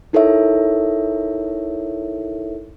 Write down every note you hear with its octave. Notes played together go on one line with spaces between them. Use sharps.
D#4 E4 A4 A#4 C#5 E5